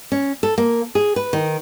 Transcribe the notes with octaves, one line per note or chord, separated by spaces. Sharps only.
C#4
A4
A#3
G#4
B4
D#3